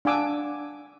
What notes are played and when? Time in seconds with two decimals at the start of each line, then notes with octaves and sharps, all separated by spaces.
0.05 D4 F5 F#5 G#5 D6 E6